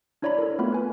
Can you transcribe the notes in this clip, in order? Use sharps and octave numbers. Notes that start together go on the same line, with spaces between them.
D4 E4 C#5 D5 A#5 B5
A4 A#4
A3 B3 C4 F4 B5
B4 G#5